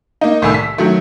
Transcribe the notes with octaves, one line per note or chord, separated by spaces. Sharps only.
A#3 D#4
C2 A2 D#3 G#5 E6
B6
D#3 F#3 A3